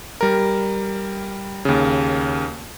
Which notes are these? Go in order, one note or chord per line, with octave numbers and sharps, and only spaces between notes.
G3 A#4
D#2 C#3